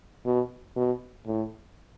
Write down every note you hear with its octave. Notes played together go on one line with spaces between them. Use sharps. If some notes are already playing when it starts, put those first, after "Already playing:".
B2
B2
A2